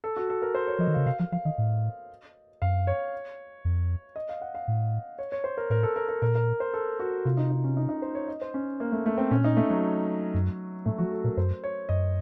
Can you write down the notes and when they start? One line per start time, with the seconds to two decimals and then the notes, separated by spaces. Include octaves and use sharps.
0.04 A4
0.16 F#4
0.30 A4
0.42 A#4
0.55 C5
0.68 C#5
0.79 F3 D#5
0.88 D#3
0.94 C#3 F5
1.06 C3 F5
1.19 F3 F5
1.32 F3 F5
1.45 D#3 D#5
1.58 A2
2.62 F#2 F5
2.87 C#5
3.65 F2
4.16 D#5
4.29 F5
4.42 F#5
4.55 F5
4.68 A2
5.19 C#5
5.32 C#5
5.44 C5
5.57 A#4
5.70 A2 A#4
5.83 A4
5.96 A#4
6.09 A#4
6.22 A#2 A#4
6.35 A#4
6.60 C5
6.74 A4
6.99 F#4
7.25 C3 F4
7.37 D#4
7.50 D#4
7.64 C#4
7.77 D#4
7.89 D#4
8.02 C5
8.15 C#5
8.28 D#5
8.41 C5
8.54 C#4
8.80 A#3
8.92 A3
9.06 A3
9.18 C4
9.31 A#2 C#4
9.44 D#4
9.57 A3
9.70 F#3
10.34 F#2
10.86 A2 A3
10.98 F3 F#4
11.12 A4
11.24 A#2 A#4
11.37 F#2 C5
11.64 C#5
11.89 F#2 D#5